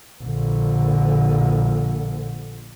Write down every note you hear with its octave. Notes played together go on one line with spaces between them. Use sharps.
A#1 D3